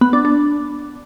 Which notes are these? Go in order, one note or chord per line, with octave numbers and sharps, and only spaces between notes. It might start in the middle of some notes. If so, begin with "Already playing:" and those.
B3
D4
D4